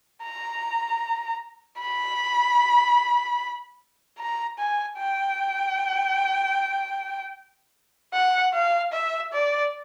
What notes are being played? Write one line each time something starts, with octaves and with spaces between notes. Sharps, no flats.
A#5
B5
A#5
G#5
G5
F#5
F5
E5
D5